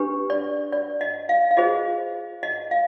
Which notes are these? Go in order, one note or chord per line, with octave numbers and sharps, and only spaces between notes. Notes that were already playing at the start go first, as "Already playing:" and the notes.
Already playing: D4 G4 B4
D5
D5
D#5
F5
F5
F4 G#4 C5 D#5
D#5
F5